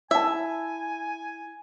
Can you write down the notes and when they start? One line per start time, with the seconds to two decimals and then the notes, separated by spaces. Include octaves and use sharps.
0.11 E4 E5 G#5 A5